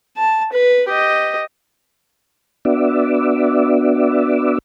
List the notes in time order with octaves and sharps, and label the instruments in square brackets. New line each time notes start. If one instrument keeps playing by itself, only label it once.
[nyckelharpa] A5
B4
G4 D#5
[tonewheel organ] B3 D4 F#4 D5 E5